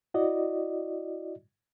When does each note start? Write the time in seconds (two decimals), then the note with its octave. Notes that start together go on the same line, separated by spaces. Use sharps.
0.14 E4 F#4 D5 D#5